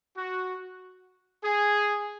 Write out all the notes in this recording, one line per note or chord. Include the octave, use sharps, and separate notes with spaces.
F#4
G#4